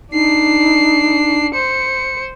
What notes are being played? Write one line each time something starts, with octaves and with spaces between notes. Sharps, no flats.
D4 D#4 C7
C5 C#7